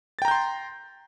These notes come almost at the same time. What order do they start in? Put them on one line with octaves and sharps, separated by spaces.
A6 G5 A#5 G6 C6